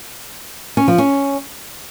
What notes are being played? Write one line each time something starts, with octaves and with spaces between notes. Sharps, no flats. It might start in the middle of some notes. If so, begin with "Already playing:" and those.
C#4
F3
C#4